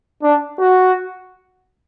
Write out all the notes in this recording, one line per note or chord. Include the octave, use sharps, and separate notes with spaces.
D4
F#4